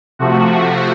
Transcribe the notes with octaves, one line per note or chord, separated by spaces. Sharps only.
C3 F3 A3 F#4